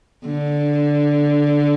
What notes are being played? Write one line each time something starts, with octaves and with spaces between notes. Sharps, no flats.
D3